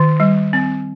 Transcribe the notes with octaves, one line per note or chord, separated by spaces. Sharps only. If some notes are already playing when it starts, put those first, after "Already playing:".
Already playing: D#3
G3
C4